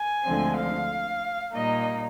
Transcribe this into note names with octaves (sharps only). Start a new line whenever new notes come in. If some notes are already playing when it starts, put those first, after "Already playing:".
Already playing: G#5
D2 D3 F3 G#3 C4
F5
A#2 G3 A#3 D#4 D#5